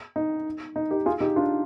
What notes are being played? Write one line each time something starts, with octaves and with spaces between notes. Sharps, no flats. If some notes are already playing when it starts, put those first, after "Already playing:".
D#4
D#4
D#4 G4
F4 G#4
D#4 G4
D4 F4